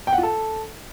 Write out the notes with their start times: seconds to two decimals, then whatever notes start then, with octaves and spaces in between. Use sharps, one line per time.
0.07 G5
0.13 F#5
0.18 F4
0.23 A4